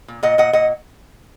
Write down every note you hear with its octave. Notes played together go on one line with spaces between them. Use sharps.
A#2
A#2 D#5 F#5
A#2 D#5 F#5
A#2 D#5 F#5